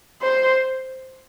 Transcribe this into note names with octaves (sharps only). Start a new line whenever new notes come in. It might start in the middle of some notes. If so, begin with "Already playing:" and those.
C5